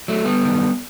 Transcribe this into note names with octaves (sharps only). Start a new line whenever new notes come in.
F#3 A3
G3 B3
F#2 D#3